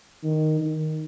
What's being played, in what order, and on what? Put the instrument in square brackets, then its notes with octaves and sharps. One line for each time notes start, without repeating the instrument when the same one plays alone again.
[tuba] D#3
D#3